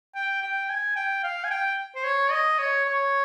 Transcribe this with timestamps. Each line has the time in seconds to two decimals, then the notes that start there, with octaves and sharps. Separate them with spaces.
0.15 G5
0.42 G5
0.69 G#5
0.96 G5
1.23 F5
1.44 G#5
1.50 G5
1.95 C5
2.04 C#5
2.31 D#5
2.59 C#5
2.86 C#5